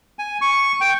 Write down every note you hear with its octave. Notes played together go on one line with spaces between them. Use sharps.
G#5
C#6
G5